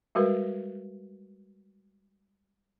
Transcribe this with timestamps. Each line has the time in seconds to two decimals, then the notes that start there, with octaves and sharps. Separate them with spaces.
0.15 G3 G#3 F#4 A#4 B4